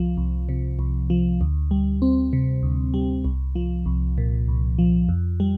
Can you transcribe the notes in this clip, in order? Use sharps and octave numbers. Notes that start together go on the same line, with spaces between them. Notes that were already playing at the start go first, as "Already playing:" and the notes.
Already playing: C2 F3
C2
C3
C2
F3
D2
G3
C4
C3
D2
G3
C2
F3
C2
A#2
C2
F3
F2
G3